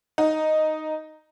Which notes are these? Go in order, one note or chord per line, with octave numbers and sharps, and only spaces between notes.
D#4